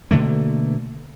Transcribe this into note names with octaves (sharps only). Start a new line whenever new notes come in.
B2 D3 A3 A#3